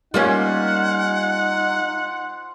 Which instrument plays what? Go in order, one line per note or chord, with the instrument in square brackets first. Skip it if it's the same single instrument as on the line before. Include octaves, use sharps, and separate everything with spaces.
[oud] G3 A#3 C#4 [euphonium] D#4 [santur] F4 C5 G#5 [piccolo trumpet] F#5